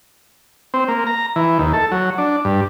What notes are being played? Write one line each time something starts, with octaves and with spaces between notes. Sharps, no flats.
C4
A#3
A#5
E3
D#2
A4
F#3
D4
G2